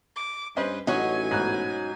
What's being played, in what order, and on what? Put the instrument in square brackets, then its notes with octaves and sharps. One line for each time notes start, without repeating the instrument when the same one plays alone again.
[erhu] D6
[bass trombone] G2 [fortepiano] C#4 C5 D#5 [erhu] B4
[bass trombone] A1 [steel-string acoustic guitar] F#3 C#4 D#4 [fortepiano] D#5 F#5 C#6 [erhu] G#5
[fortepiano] G#2 B2 F#6